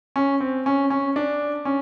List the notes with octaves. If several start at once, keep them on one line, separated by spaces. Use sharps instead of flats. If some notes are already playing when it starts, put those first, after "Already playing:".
C#4
C4
C#4
C#4
D4
C#4